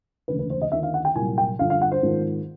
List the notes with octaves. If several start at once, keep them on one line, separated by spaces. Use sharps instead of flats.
E1 D2 C#3 B4
B4
C5
D#5
D#2 D3 F3 A#3 E5
F5
F#5
G5
C2 A#2 F#3 A#3 G#5
G5
G2 D3 F3 F5
F5
F#5
C5
G#1 G#2 F3 A#3